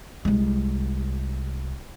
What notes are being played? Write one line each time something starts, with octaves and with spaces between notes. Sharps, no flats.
C2 G#3